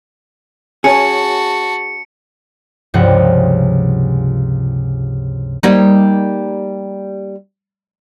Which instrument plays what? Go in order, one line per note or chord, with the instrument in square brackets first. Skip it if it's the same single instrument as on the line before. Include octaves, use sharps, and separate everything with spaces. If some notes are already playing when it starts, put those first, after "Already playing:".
[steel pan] C#4 C#5 [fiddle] F#4 A5 [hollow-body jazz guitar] G#4 [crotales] C#7
[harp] C#2 G2 C3 F3 F#5
[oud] G3 A#3 D#4